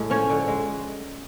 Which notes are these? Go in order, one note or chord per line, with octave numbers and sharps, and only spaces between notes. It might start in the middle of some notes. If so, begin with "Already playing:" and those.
Already playing: A2 G#3
F3 C#4 C#5
D3
G#3